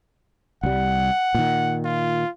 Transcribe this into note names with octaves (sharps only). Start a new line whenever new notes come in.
C2 G3 F#5
A#2 D#3
F4